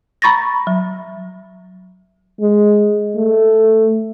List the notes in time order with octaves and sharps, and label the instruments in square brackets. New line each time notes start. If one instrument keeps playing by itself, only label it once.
[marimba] A#5 B5 C#6 A6 A#6
F#3
[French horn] G#3
A3